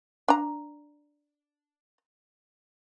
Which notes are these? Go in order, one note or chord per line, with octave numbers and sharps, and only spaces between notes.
D4 A#5